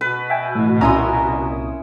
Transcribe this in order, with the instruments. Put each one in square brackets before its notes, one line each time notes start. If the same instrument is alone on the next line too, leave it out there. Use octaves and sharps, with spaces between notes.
[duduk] B2 [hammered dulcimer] B4
[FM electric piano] E5 G5 G#5
A2 E3
[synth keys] C2 A#2 D#6 [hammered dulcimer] C#4 E4 C6 [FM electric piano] A#5